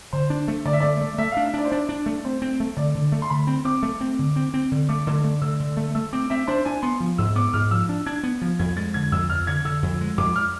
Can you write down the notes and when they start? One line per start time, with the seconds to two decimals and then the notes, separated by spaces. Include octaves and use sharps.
0.13 D3 C5
0.30 D4
0.48 A3
0.65 D3 D5
0.73 E5
0.80 A3 D5
1.01 A3
1.18 A3 E5
1.32 F5
1.37 D4
1.45 E5
1.54 D4 D5
1.65 C5
1.71 D4 D5
1.89 D4
2.06 A3
2.25 C4 C5
2.42 C4
2.60 A3
2.77 D3 D5
2.95 D3
3.12 A3
3.22 C6
3.30 D3 B5
3.47 C4
3.65 C4 D6
3.83 A3
4.01 C4
4.19 D3
4.36 C4
4.54 C4
4.71 D3
4.89 A3 D6
5.07 D3
5.24 A3
5.42 D3 E6
5.60 D3
5.77 A3
5.95 A3 E6
6.13 C4 D6
6.30 C4 E5
6.47 D4 C5
6.65 D4 G#5
6.82 B3 C6
7.00 F3
7.18 G#2 E6
7.35 B3 D6
7.53 G#2 F6
7.71 F3 E6
7.89 D4
8.06 D4 G#6
8.23 B3
8.42 F3
8.59 F2 G#6
8.76 G#3 A6
8.94 D3 G#6
9.12 F2 E6
9.29 F2 F6
9.47 D3 G#6
9.65 D3 E6
9.83 F2
10.01 G#3
10.18 F2 D6
10.36 F6